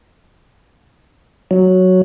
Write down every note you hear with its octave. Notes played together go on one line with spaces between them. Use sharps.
F#3